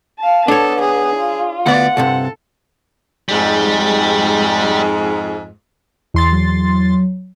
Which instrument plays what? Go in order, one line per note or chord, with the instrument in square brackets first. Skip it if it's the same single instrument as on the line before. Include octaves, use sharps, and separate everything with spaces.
[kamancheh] F5 A5
[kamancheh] B3 [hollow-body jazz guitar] D4 C#5 [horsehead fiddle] A4
[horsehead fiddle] G#4
[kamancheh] F4
[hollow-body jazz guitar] D2 B3 [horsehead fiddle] D5 [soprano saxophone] F#5
[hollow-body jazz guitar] C2 G2 C3 [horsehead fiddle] A4
[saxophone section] F2 G#2 [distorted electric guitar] G3
[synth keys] E2 C6 A6
[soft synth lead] F#3